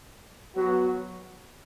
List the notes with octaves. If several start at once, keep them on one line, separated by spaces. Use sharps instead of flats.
F#3 B3 F#4